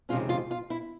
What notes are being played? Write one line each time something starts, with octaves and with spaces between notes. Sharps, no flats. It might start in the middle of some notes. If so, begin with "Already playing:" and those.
F2 C3 D#3 G#3 C#4 F4
F4
F4
E4